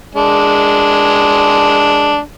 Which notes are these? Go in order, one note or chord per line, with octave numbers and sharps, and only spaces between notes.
G#3 D4